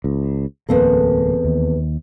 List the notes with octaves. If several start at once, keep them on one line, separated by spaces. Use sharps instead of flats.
C#2
D1 E2 A#3 C4 A4
D#2